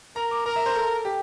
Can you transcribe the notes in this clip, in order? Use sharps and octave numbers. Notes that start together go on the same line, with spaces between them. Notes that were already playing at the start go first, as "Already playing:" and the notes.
A#4 A#5
D6
A#4 A#5
E5
C5
A4
G4